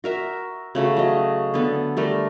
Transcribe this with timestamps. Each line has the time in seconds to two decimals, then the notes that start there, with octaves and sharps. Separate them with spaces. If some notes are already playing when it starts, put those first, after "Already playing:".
0.04 F#4 A#4 E5
0.75 C#3 A3 F#4
0.97 F#3 D#5
1.54 D3 B3 A4
1.97 G3 A3 A#4